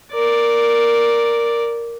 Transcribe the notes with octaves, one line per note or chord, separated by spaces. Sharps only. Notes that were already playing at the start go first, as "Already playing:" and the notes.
A#4 D5